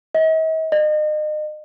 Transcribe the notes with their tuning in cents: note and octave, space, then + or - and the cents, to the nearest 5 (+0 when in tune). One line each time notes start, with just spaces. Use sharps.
D#5 +45
D#5 -35